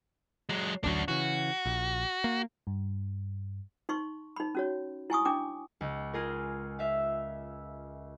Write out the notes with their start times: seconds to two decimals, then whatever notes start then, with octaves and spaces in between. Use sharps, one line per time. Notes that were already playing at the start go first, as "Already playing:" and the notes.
0.49 F#3 G#3
0.84 A1 D2 F#3 D4 F#4
1.08 C#3 E3 F#4
1.66 A#1
2.24 A#3
2.67 G2
3.89 D#4 C6 C#6
4.36 D#4 B5
4.55 C#4 F#4 C#5
5.10 E4 G#5 C#6 D#6
5.25 D4 G5 D6
5.81 C#2
6.13 F4 G#4 A#4
6.79 E5 F5